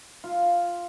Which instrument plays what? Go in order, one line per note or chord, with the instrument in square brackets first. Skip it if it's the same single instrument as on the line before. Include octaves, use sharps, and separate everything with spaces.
[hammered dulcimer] F4